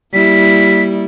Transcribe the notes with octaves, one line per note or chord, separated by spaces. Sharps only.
G3 A#3 E4 B6